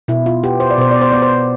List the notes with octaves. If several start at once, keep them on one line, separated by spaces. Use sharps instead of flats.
B2 E4
F4
B3 G4
C5
D5
B2 C5
D5
C5
B3 D5
C5